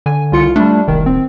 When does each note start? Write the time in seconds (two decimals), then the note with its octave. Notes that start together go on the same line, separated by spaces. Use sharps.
0.06 D3 G#5
0.32 C2 F4 C#7
0.56 G3 A3 D4
0.88 F1 C2 D#3
1.06 D#1 C4